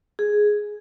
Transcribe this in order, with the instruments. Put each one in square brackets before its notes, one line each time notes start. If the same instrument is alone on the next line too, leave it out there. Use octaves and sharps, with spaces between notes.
[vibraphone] G#4